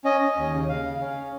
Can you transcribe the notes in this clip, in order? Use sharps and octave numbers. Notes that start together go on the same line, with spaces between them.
C#4 D#5
C#4
D#2
C#3
C#3 F5
C#3
C#4